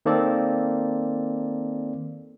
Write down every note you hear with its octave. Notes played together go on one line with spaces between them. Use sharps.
D#3 A#3 C4 A4 D5